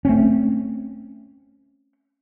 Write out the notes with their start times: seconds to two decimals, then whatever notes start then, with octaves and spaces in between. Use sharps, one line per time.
0.05 A3 C4 C#4